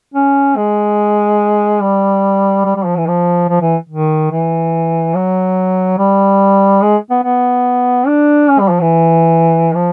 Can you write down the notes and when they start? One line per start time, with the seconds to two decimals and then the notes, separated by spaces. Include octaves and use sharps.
0.14 C#4
0.56 G#3
1.81 G3
2.65 G3
2.75 G3
2.86 F3
2.96 E3
3.07 F3
3.48 F3
3.61 E3
3.89 D#3
4.31 E3
5.15 F#3
5.98 G3
6.82 G#3
7.10 B3
7.23 B3
8.07 D4
8.49 C#4
8.60 G3
8.70 F3
8.81 E3
9.75 F3